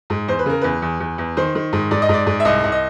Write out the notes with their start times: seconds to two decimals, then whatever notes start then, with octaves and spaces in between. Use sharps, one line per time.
0.10 G#2
0.28 E2 C5
0.39 B4
0.46 C#3 A#4
0.61 E2 B4
0.82 E2
1.00 E2
1.18 E2
1.37 D#3 C5
1.55 D#3
1.73 G#2
1.91 G#2 D5
2.02 D#5
2.09 G#2 D5
2.26 G#2
2.40 E5
2.45 C2 D#5
2.64 C2
2.72 D#5